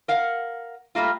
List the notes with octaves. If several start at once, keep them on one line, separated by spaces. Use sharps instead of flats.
A#4 F5 F#5
G3 A3 A#3 F4